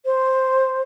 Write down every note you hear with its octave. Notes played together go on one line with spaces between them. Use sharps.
C5